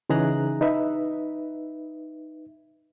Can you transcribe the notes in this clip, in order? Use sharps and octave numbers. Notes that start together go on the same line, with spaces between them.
C#3 E3 D#4 G#4 A#5 F#6
D#4 B4 E5